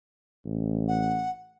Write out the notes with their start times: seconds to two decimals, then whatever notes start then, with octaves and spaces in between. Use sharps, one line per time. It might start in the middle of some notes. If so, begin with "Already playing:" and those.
0.46 A1
0.88 F#5